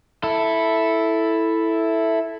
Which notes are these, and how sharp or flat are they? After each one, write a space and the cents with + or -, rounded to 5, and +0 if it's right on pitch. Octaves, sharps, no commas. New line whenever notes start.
E4 +0 A4 +0